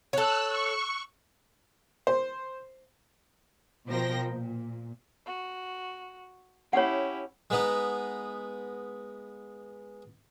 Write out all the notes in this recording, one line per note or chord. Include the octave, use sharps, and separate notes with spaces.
A4 C#5 E6 F#6
C#6
C5
B2 F3 A#4 C5 G5 A#6
A#2
F#4
C#4 E4 G4 C#5 F#5
G#3 B3 D#4